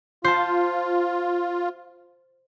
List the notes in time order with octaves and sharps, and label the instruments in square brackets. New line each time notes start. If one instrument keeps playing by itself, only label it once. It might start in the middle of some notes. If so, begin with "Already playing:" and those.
[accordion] F4 [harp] C5 A5